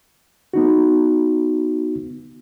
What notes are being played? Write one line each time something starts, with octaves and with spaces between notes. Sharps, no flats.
B3 D#4 F#4